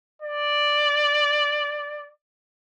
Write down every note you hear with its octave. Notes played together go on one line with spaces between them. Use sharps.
D5